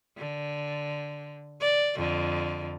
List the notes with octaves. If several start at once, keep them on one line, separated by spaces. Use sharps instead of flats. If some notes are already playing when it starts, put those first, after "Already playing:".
D3
D5
F2 D3